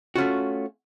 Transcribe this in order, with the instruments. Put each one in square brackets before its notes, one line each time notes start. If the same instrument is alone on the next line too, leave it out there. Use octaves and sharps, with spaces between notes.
[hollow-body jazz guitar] A3 C#4 F4 F#4